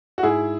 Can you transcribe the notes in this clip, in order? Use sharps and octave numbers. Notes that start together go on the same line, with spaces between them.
F#4
G#2 E4 G#4